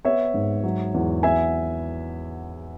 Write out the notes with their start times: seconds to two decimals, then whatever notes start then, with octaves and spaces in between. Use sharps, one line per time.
0.05 B3 C#5 E5
0.34 G#2
0.64 F#3
0.94 E2
1.23 B3 E5 G#5